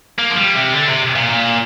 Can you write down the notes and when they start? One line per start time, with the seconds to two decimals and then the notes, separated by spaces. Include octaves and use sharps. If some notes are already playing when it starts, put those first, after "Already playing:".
0.18 A#3
0.30 F3
0.37 G3
0.55 C3
0.73 D3
0.88 C3
1.16 A#2
1.29 A#2